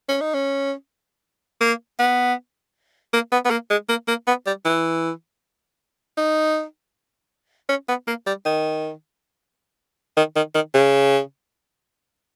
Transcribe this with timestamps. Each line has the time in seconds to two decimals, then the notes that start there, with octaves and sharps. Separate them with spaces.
0.08 C#4
0.21 D#4
0.34 C#4
1.61 A#3
1.99 B3
3.13 A#3
3.32 B3
3.45 B3
3.51 A#3
3.70 G#3
3.89 A#3
4.08 A#3
4.27 B3
4.46 G3
4.65 E3
6.17 D#4
7.69 C#4
7.89 B3
8.07 A#3
8.27 G3
8.45 D#3
10.17 D#3
10.36 D#3
10.55 D#3
10.74 C#3